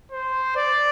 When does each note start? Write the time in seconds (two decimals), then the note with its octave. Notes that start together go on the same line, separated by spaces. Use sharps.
0.12 C5
0.56 D5